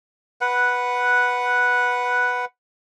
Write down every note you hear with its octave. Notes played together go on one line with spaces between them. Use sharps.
B4 F#5